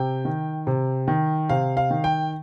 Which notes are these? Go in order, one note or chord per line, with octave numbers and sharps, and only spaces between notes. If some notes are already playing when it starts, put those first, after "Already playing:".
Already playing: C3 G5
D#3
C3
D#3
C3 F5
F5
D#3
G5